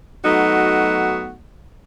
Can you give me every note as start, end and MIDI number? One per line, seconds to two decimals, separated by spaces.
0.24 1.35 54
0.24 1.35 57
0.24 1.35 59
0.24 1.35 63
0.24 1.35 66